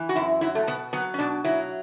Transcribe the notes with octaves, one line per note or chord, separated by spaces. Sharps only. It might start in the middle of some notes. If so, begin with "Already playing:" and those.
Already playing: E3
F#4
F#2 E4
F#3 E4
A3
B2 B3
F#3 B3
C#4
B2 D4
F#3 E4